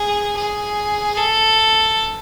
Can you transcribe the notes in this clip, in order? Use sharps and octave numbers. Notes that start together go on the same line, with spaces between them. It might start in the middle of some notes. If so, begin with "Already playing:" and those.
Already playing: G#4
G#4
A4